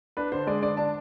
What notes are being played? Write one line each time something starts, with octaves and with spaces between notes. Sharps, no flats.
D4 B4
D3 C5
G#3 D5
D3 D5
D4 A5